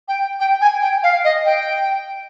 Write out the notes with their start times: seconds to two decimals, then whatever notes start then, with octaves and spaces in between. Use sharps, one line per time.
0.08 G5
0.40 G5
0.61 G#5
0.82 G5
1.03 F5
1.24 D#5
1.46 G5